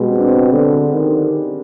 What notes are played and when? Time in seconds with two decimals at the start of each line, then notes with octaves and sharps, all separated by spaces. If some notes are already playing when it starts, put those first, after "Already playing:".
Already playing: B2 G3 G#3
0.11 C4
0.19 D4
0.27 C4
0.53 D3
0.94 D#3